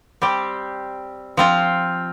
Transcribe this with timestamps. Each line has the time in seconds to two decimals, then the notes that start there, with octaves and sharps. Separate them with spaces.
0.22 G3 C4 G4
1.37 F3 C4 F4